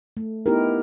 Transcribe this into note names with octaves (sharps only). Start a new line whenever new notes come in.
A3
B3 D#4 E4 G4 A#4